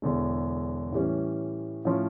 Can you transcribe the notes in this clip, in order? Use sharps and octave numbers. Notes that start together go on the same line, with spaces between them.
E1 E2 D3
A2 E3 G3 C#4
A2 F3 C#4